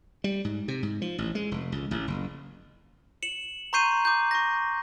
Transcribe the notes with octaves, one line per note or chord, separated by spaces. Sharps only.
G3
G#2
C3
G#2
F3
A1
G#3
F1
C#2
A1
F#1
C#7 E7 F#7
A#5 C6 C#6 G6 C7 D#7
D6 G6
C#6 A#6